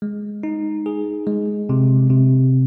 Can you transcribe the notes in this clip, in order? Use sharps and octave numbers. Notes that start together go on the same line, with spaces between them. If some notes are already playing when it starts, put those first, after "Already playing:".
G#3
D#4
G#4
G#3
C3
C3